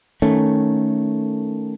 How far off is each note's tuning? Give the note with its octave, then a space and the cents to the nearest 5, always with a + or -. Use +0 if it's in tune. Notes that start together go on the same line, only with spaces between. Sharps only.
D#3 +0 A3 +0 C#4 +0